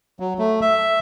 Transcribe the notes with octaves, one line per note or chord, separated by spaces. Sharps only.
F#3
A3
E5